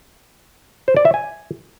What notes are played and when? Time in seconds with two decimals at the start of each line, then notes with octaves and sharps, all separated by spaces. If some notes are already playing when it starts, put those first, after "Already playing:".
0.88 C5
0.97 D5
1.05 E5
1.14 G#5